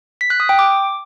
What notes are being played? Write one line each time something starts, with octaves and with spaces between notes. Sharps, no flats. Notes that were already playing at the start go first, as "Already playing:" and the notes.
B6
F#6
D#6
G5
D6